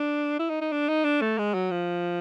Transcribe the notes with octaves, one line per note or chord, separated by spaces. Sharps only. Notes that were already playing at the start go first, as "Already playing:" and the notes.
Already playing: D4
E4
D#4
D#4
D4
D#4
D4
A3
G#3
F#3
F3